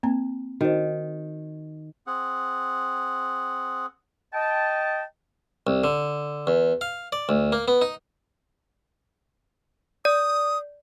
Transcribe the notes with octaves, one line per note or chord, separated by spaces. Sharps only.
A#3 C4 A#5
D#3 F#4 C5
C4 G#4 F#5
D#5 G5 A5
C2
D3
E2
F5
D5
D2
A#3
B3
D#4
D5 D#6